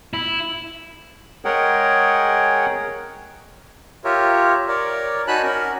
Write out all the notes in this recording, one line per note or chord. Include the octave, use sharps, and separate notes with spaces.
E4
G#3 G#4 A#4 C#5 F#5 G5
F4 G4 A#4 C#5 E5
A#4 C#5 D5
D#4 F#4 G#5 A5 B5 F#6
C#4 F#4 A#4